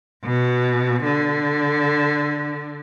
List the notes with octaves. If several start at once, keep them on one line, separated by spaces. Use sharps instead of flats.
B2
D3